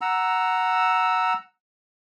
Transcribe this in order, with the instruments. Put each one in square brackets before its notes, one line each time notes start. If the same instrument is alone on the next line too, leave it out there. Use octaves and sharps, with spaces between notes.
[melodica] F#5 A#5 E6